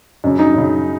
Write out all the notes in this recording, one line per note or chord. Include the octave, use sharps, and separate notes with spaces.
F#2 C#3
D#4
F#2 C#3